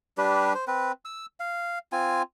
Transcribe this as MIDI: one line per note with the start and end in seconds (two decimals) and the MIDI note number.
0.18 0.53 55
0.18 0.53 62
0.18 0.53 67
0.18 0.53 71
0.54 0.65 72
0.67 0.92 60
0.67 0.92 71
1.05 1.26 88
1.40 1.79 77
1.92 2.22 60
1.92 2.22 65
1.92 2.22 80